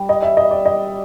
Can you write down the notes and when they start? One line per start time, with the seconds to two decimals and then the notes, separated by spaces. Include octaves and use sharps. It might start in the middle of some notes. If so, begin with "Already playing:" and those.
Already playing: G3
0.09 D#5
0.23 E5
0.37 D#5
0.51 D5
0.66 D#5